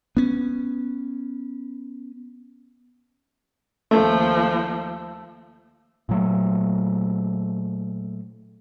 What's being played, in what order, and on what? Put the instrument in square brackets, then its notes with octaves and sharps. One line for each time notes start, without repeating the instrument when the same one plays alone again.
[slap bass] B3 C#4
[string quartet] D#2 F3 [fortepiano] A3
[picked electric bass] A#2 F#3 A3